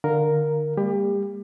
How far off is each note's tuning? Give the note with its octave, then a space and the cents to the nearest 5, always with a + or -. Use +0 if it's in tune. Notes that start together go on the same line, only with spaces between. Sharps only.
D3 +25 A#4 +0 F5 +0
G3 +35 A#3 -25 G4 +30